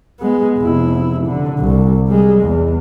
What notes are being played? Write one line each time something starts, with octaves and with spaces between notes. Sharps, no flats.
G#3 B3
F1 E4
D3
C2
G3 G#3
E2